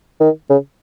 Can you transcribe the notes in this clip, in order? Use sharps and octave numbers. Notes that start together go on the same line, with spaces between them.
D#3
C#3